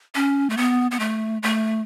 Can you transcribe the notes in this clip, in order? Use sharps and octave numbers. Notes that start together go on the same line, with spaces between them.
C#4
A3
B3
B3
A3
A3